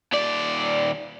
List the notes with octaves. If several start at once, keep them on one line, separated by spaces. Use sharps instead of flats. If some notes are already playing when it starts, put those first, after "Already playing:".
D#2 D5